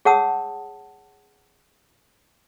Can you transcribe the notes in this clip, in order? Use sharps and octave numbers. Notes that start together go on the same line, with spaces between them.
G#4 C#5 F#5 A5 D#6 E6